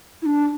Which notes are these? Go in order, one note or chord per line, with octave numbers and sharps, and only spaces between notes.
E4
D4